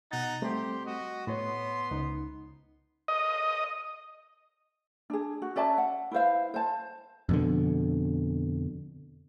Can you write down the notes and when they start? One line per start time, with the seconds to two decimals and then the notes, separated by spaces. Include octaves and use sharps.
0.11 B2 D#4 F#5 A6
0.42 G3 A3 C4 G4 C6
0.85 F#4 D#5
1.27 A2 B3 C#5 C6
1.91 C#2 D#4
3.08 D#5
5.10 D4 G#4
5.42 F#4
5.56 C#4 D5 E5 A5
5.78 F#5
6.11 E4 B4 C5 F5
6.54 C5 A5
7.29 F2 B2 D3